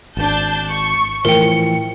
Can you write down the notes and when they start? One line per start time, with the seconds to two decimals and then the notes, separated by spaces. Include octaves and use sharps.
0.17 G#1 D4 A5 G6
0.69 C#6
1.25 A2 E3 F3 A#4 G5 C#7